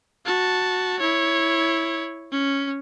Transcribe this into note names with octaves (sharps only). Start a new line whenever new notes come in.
F#4 A5
E4 C#5
C#4